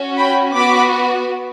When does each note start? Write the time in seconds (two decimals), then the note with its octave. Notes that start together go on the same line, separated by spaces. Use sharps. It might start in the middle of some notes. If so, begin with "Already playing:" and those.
Already playing: C#4 F#4
0.18 G5 B5
0.54 B3 F#4 B5 D6